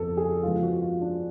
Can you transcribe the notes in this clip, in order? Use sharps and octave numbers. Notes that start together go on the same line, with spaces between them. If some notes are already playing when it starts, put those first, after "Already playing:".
Already playing: F2 F3 B3 A4
G#4
C#3 F3 G#3 B3 F4
F#4
F4
D4